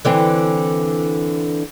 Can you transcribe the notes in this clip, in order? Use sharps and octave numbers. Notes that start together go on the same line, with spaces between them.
D3 E3 C4